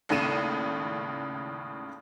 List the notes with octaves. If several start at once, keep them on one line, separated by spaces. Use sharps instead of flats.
G#1 D#2 A2 C#3 D#7 E7